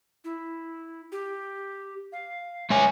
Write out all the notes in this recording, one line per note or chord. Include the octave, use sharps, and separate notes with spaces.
E4
G4
F5
G#3 C#5 E5 G#5